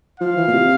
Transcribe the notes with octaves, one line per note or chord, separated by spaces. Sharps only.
F3 F5
E3
A#2
C3